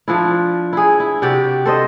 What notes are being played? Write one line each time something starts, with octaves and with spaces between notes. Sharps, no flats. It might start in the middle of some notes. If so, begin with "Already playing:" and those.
F3 D4 E4
E4 G#4
E4
C3 F#4 G4 D5
A4 C5 D#5